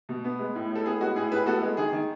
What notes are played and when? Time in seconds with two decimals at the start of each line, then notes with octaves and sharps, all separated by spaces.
0.09 B2
0.24 B3
0.39 G#3
0.55 A2
0.71 A2 A4
0.86 B3 G#4
1.00 G#3 F#4
1.15 A2 G#4
1.31 A2 G#4 B4
1.46 B3 F#4 A4
1.62 G#3
1.77 D#3 G#4
1.92 D#3